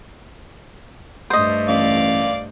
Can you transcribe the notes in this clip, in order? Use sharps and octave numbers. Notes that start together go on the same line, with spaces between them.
G2 A3 C5 D#5
A1 D5 F5